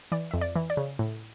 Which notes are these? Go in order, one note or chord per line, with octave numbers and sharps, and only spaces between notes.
E3 D5
F2 E5
D5
E3
D5
C#3
A2